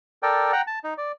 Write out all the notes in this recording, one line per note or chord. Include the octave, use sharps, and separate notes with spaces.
A4 A#4 D5 G5
F#5 G5 A#5
A5
D#4
D5